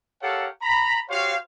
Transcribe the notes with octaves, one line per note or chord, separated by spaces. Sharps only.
G4 A4 A#4 C#5 F5 F#5
A#5 B5
F#4 G4 C5 C#5 F5